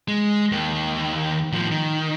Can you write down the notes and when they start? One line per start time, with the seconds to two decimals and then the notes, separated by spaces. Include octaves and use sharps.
0.08 G#3
0.52 D#2 D#3
1.52 A2 F3
1.71 D#3